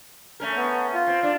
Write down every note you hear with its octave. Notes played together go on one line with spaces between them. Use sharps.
A3 C#4 A#4
B3
F4
C4
D4